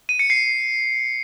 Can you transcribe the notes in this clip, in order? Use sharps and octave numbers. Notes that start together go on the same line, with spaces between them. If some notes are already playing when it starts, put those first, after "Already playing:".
D#7
C#7
C7